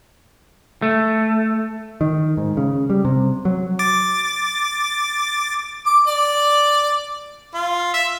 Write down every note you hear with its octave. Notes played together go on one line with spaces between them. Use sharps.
A3
D#3
G#2
C#3
G3
C3
F#3
D6 A6
D6
D5
F4
E5